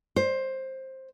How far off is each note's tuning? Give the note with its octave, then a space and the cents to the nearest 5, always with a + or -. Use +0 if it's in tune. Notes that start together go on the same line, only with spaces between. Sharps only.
C5 +15